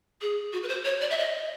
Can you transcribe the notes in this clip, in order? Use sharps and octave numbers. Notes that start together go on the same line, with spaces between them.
G#4
F#4
B4
C5
C#5
D5
E5
D#5